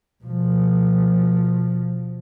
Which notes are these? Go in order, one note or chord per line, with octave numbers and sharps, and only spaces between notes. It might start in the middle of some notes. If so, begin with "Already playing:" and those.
B2 F3